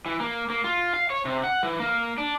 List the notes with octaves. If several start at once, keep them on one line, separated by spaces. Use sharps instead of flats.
E3
A#3
A#3
F4
F5
C#5
C3
F#5
E3
A#3
D4